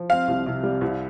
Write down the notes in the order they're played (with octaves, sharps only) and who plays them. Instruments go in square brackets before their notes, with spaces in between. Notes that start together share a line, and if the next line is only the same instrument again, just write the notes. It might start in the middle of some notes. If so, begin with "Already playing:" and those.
Already playing: [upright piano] F3
[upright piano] C4 [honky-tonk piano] F5
[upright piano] C2
C3
G3
C2